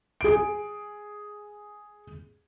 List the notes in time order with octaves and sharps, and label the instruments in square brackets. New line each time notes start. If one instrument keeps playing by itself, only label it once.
[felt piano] G#4 D7